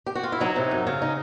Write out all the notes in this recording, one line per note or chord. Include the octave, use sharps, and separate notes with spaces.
G4
F#4
F4
E4
F#3 D#4
C3
F#2
C#3
D#4